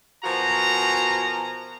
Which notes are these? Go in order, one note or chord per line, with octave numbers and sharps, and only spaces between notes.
B2 F3 F#4 A#4 G#5 A#5